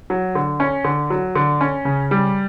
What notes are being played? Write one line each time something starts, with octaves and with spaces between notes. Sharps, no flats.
F#3
D3
C#4
D3
F#3
D3
C#4
C#3
G3